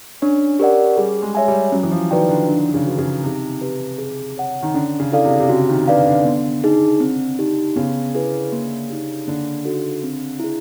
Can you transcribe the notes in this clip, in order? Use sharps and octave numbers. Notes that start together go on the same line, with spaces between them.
C#4 D4
G4 A#4 D5 F#5
G3 G#4
G#3
C#5 E5 G#5
G3
F#3 C#4
E3
F3
D#3 F#4 B4 D5 G5
D3
D4
C#3
F#4 B4
C#3
C3 D#4
G4 B4
G#4
C#5 F#5
D#3
D3 C#4
C#3
E4 A4 D5 F5
C3
C3
C#3 F#4
D#3
D3 B4 D5 F5
D3
B3
D#4 G#4
C4
D#4 G4
C#3 B3
E4 G#4 B4
A#3
D#4 G4
D3 A#3
D#4 F#4 A4
C4
E4 G#4